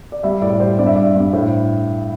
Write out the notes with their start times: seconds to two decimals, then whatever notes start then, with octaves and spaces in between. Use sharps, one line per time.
0.12 D5
0.23 G3 E5
0.42 A2 D5
0.60 G3 C5
0.79 G2 D5
0.87 E5
0.95 G2 D5
1.15 G2
1.33 A2 C5